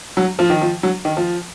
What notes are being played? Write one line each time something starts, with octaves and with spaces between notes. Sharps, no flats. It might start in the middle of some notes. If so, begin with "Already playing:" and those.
F#3
F3
D#3
F3
F#3
D#3
F3